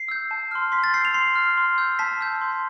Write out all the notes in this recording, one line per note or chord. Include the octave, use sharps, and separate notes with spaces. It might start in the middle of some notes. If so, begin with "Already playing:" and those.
Already playing: C7
E6 G6
A5
C6 F6
C6 B6
A6
E6 G6 C7
F7
C6 C7
F6
C6
E6 G6
A5 B6
E6 G6
C6